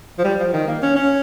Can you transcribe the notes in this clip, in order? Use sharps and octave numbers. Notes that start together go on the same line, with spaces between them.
F3
G3
F3
D#3
A#3
C#4
C#4